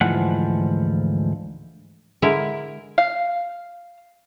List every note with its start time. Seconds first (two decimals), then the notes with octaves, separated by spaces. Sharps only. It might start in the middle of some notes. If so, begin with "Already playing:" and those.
0.01 D2 G#2 E3 F3 F#5
2.22 D3 G#3 E4 A#4
2.98 F5